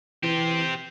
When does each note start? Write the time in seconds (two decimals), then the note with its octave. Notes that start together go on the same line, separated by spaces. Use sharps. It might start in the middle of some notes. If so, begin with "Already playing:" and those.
0.23 E3 C4 G4